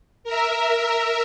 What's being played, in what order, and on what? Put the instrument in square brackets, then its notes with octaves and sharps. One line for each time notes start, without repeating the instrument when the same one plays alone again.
[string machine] A#4 E5